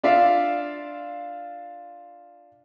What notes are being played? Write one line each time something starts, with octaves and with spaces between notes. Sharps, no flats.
D4 F4 D5 E5 F5